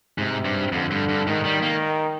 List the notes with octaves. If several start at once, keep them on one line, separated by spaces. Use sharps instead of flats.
G#2 C3
G2
F2 D3
G2
G2
G#2 D#3
G3
A#3